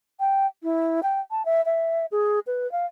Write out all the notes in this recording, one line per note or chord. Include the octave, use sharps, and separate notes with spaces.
G5
E4
G5
A5
E5
E5
G#4
B4
F5